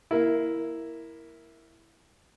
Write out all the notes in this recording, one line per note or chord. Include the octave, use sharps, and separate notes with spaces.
A#3 E4